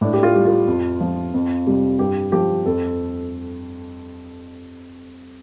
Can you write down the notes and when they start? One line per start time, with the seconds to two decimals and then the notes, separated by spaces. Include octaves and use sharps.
0.01 A2 D4
0.13 G4
0.23 F4
0.35 G3
0.45 F4
0.68 F2
1.01 F3
1.34 F2
1.67 C3 G3
1.99 G2 G4
2.32 F3 G4
2.66 F2 A4